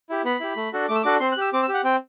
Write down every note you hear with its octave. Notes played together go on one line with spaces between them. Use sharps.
E4 G4
B3 B5
E4 G4
A3
D4 F#4 A4
A3 D6
E6
D4 F#4 A4 D6
C4 C6
F#6
G4 E6
C4 D6
E6
G4
F#5
C4 G5